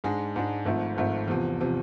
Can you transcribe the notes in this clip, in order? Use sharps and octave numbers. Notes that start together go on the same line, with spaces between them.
G#2 G#3 D4
G#2 G#3 D4
G#1 G#2 F3 A3
G#1 G#2 F3 A3
E2 C3 F3
C3 F3